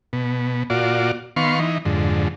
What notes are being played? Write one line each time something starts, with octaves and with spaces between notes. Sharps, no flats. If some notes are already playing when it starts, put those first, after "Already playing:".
B2
A#2 F4 F#4 D5
D#3 B3 F5 C6 C#6
E3 D#4
F2 G#2 D3